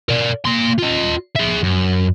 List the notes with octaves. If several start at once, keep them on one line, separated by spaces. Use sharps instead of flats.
A#4 D5
A#3 C6
F4 D#5
G#4 E5
F#2